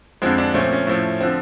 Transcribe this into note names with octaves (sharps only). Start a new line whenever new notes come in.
F2 D3 F3 G#3 C4
D4
A#2 F3 A3 C#4
C4
C#4
A2 F3 A3
D3 F3 C4